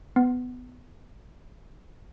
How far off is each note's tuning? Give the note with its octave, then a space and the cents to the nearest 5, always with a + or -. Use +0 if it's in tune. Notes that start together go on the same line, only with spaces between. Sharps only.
B3 +15